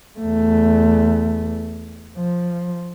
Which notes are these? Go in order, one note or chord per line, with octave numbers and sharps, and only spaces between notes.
E2 A3
F3